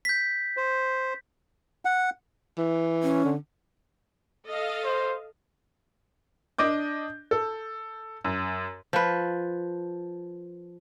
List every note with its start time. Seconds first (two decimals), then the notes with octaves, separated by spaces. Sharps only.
0.05 G6 B6
0.57 C5
1.85 F#5
2.58 E3
3.03 C#4
3.25 D3
4.48 A4 D#5 F5
4.84 C5
6.59 D4 D#5 D6 G6
7.31 A4
8.24 F#2
8.93 F3 B4